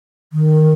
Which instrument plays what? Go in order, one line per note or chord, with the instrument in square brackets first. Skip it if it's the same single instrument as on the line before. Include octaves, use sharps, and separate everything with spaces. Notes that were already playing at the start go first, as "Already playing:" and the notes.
[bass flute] D#3